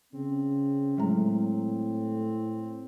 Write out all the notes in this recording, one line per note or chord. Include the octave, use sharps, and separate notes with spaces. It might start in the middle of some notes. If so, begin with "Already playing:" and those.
C#3 C4
A2 F#3 G#3 A#5